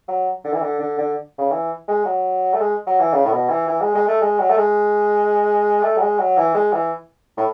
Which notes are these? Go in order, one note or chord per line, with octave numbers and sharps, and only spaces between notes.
F#3
D3
E3
D3
D3
D3
C#3
E3
G#3
F#3
A3
G#3
F#3
E3
C#3
A2
B2
E3
E3
G#3
G#3
A3
G#3
F#3
A3
G#3
A3
F#3
G#3
F#3
E3
G#3
E3
A2